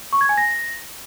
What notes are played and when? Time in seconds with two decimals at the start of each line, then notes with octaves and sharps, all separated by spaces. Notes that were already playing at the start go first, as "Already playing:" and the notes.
0.13 C#6
0.21 G#6
0.29 G#5
0.37 A#6